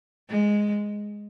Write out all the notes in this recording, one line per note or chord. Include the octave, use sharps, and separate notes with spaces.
G#3